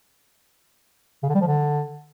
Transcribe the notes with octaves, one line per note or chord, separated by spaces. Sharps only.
C#3
D3
G3
F3
D3